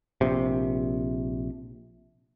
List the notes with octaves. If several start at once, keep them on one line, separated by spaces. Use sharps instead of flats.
A#1 C3